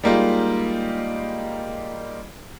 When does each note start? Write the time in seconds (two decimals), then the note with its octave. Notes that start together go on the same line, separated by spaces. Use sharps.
0.04 G3 G#3 A#3 D#4 F4